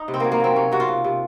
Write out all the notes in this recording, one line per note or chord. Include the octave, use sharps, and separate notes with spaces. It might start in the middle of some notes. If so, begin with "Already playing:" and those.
Already playing: D#4
C3
C4
F#3 A#3
A#3
F#3 C4
C3 C#4
C3 F#4
F4
C3
C3